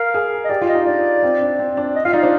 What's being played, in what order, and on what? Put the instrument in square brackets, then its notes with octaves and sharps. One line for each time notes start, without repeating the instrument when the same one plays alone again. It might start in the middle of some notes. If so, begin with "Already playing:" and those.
Already playing: [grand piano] A#4 [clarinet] F5
[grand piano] G#4
[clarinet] D#5
[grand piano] G4 [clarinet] D5
[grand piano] F4
[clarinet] D#5
[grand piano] D#4
[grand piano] D4 [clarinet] D5
[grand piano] C4
D4
C4
D4
[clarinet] D#5
[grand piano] F4 [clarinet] F5
[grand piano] D#4 [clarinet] D5
[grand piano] D4 [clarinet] C5